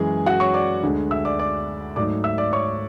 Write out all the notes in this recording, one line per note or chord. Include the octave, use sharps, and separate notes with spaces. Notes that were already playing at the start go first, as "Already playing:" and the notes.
Already playing: F#2 E3 G#3 G#4 G#5
F#4 F#5
C#5 C#6
D5 D6
D2 D3 G#3
E5 E6
D5 D6
D5 D6
G#2 F#3 A3 D5 D6
E5 E6
D5 D6
C#5 C#6